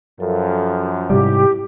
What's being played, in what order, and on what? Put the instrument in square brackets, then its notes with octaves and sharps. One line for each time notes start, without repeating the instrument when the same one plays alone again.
[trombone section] F#2 F3 [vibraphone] A4
[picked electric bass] G#2 C3 G3 [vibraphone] E4 [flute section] G4